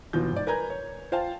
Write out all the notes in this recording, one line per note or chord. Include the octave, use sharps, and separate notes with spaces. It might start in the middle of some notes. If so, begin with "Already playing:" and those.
D#2 B2 E3 F3 F4 G6
G#2 D5
A#4 B4 G#5 A#5 G6 G#6
C#5
F4 C5 F5 G5 A5